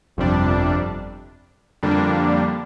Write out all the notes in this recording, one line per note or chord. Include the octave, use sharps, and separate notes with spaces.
G1 F2 C3 G3 D4
F2 D3 G3 A#3 D4